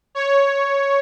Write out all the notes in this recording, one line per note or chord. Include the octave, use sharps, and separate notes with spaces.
C#5